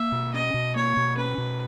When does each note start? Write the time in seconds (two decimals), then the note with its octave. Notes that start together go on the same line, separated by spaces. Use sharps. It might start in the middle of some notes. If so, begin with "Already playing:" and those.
Already playing: A#3 E5
0.12 B2
0.34 C#4 D#5
0.54 B2
0.75 A#3 C#5
0.97 B2
1.17 C#4 B4
1.38 B2